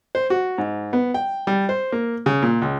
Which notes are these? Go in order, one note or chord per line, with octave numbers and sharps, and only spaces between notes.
C5
F#4
G#2
B3
G5
G3
C5
A#3
C#3
A#2
C#2